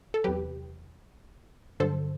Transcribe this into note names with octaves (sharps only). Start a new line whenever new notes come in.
A4
E2 C3 F#3 G4 B4
G2 D3 F#3 A4 C5